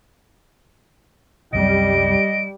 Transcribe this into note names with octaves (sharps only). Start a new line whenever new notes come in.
C2 F#2 C3 G3 D#5 D7